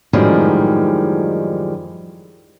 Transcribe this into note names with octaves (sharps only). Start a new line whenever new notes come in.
F#2 A2 D#3 F3 G3 G#3